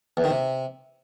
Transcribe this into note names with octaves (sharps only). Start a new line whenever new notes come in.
E2
D#3
C3